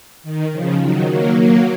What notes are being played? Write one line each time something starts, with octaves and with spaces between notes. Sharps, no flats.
D#3
C#3 F3
D#3 F#3
F#3 A#3
F#3 A#3